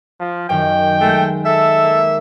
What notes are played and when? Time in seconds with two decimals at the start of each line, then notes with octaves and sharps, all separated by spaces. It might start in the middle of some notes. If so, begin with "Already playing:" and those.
0.20 F3
0.50 F#2 D#3 G5
1.01 G#3 A3
1.45 A4 E5 B6
1.83 A#3 B6